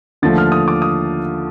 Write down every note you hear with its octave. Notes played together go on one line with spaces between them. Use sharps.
D#2 D3 F3 A3 A6
F6
D#6
D6
D#6